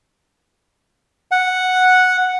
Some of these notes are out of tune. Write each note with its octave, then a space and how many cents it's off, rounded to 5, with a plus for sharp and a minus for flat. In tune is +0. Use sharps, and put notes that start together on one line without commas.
F#5 -5